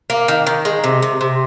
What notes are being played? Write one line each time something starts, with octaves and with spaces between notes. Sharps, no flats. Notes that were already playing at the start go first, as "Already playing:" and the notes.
A#3
D#3
D#3
G#3
C3
C3
C3